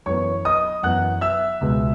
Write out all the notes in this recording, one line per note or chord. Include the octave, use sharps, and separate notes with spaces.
F#2 E3 B3 C#5 C#6
D#5 D#6
F#2 E3 B3 F#5 F#6
E5 E6
C#2 B2 G#3 B3